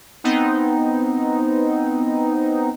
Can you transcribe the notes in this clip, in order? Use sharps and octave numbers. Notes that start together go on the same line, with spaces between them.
B3 C4 D#4